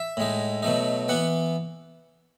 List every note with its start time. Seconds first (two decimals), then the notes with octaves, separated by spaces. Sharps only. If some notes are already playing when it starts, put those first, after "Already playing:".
Already playing: E5
0.17 A2 G#3 D#4
0.62 B2 F#3 A3 D#4
1.09 E3 B3 F#5